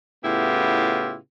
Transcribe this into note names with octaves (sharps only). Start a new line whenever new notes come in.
A2 C#3 B3 E4 F4 G4